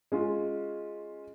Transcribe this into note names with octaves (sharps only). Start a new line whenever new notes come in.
G#3 C#4 F4